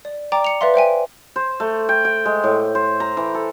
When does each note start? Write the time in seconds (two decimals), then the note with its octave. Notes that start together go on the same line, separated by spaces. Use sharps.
0.05 D5
0.32 D5 G5 A#5 D6
0.44 C#7 F7
0.61 B4 D5 E5 F5 C6
0.74 C5 E5 G5 G#5
1.36 C5
1.60 A3
1.89 G5
2.05 G5
2.25 G#3
2.44 A2
2.75 C5
3.00 A#5
3.17 E3
3.35 A4